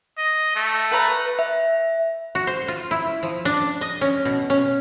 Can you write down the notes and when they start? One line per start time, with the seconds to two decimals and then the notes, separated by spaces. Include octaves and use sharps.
0.18 D#5
0.56 A3
0.91 B4 A#5
1.39 E5
2.35 F#4
2.47 C5
2.68 F4
2.91 E4
3.23 F3
3.45 D4
3.81 D#5
4.01 C#4
4.25 B2
4.50 C#4